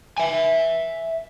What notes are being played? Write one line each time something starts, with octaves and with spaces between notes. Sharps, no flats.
E5 G#5